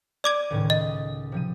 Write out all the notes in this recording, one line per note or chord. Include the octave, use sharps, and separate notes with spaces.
D5 D6 G6 G#6 D7 D#7
C#2 A2 D#3
D#5 D#6
C3 F3 D#7